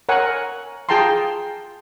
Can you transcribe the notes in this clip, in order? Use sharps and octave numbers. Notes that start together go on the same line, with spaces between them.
A#4 C#5 F#5 G#5
F4 G#4 G5 A5 A#5 C6